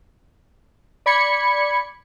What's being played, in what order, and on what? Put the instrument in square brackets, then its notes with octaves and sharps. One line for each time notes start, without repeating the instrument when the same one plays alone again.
[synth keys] D5 B5 G#6 C#7